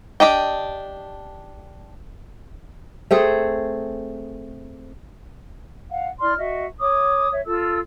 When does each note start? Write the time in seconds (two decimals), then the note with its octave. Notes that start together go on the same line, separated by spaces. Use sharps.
0.20 D4 G4 D#5 G5
3.11 A3 C4 G#4 A4
5.89 F5 F#5
6.20 E4 D5 C6 F6
6.38 F#4 D#5 E5
6.79 C#5 D6 D#6
7.31 C#5 E5
7.45 F4 A4 E6